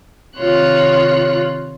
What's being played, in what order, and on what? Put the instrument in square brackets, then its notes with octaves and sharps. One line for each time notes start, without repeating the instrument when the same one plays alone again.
[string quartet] C3 D#3 F4 C#5 F#6